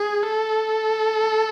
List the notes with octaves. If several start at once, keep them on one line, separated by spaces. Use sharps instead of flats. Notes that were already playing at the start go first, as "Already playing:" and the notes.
Already playing: G#4
A4